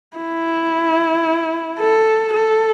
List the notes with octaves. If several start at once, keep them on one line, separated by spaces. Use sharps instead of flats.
E4
A4
A4